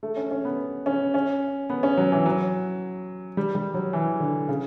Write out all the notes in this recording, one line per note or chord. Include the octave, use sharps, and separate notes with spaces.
A3
C#4
C#4
B3
C#4
C#4
B3
C#4
F#3
E3
F#3
G3
G3
F#3
E3
D3
C#3